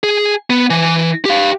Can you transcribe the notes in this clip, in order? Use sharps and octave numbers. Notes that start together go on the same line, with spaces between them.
G#4
B3
E3
G4 F5